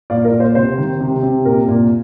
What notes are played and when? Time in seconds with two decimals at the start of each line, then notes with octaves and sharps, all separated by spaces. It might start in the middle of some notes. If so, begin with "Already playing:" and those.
0.10 A#2 D5 F5
0.24 A#4 D5
0.32 A#2
0.40 C5
0.55 C3 C5
0.78 D#3
1.01 C3
1.23 C3
1.45 A#2 A#4
1.68 A#2